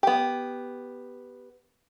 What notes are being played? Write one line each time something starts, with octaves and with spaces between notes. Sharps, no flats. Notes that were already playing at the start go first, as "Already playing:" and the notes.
B3 G4